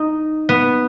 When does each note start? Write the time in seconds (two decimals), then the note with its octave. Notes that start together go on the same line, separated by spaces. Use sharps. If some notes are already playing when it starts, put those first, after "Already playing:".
Already playing: D#4
0.49 B3